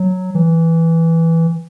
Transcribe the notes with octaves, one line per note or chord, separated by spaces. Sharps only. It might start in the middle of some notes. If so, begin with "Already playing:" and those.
Already playing: F#3
E3